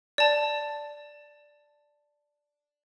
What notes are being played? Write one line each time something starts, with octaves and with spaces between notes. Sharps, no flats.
D5 A5